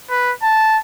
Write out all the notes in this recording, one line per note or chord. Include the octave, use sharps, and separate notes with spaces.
B4
A5